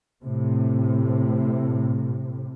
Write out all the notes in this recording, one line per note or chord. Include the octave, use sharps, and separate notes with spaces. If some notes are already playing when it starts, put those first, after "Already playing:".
A2 C3